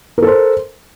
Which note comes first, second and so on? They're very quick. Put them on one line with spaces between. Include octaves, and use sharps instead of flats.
A#4 A4 C5